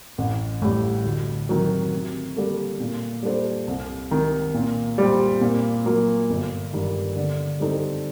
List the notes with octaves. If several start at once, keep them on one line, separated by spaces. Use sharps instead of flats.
A1
A2 G3
D2
C3 D#3 F#3
C3
G3 A#3 F#4 A4
A#2
G3 D4 A4 C5
C2
C3 D#3
A#2
G3 C4
A#2
F#3 A#3
G1
G2 D#3
D3
G3 C4 D#4 A4